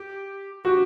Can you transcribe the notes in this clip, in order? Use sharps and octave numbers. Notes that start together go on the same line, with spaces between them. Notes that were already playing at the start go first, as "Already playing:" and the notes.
Already playing: G4
F#4 G4